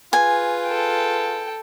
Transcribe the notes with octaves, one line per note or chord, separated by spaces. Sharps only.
F4 G#4 B4 G#5
A4 G5